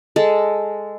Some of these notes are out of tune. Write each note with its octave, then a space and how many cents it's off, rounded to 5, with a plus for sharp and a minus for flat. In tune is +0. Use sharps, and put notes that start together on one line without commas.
G#3 -5 A4 +0